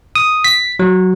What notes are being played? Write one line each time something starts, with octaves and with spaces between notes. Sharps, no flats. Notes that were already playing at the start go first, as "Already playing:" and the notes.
D#6
B6
F#3